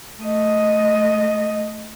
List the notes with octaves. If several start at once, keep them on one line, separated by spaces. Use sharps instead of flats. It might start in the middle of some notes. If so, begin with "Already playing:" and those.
A3 D#5